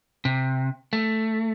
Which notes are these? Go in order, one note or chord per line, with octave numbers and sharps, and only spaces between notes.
C3
A3